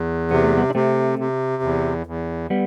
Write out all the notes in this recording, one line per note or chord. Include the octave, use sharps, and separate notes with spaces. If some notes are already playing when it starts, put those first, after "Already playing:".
Already playing: E2
C3 B3
A3
G3 B3
D4
C3 A3 C4
C3
E2
E2
G3 B3